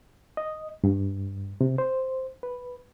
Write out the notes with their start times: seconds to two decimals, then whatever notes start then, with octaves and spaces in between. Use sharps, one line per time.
0.37 D#5
0.84 G2
1.61 C3
1.78 C5
2.43 B4